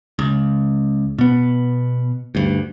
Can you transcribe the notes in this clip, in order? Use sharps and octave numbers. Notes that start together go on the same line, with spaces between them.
C#2
B2 B3
D2 G2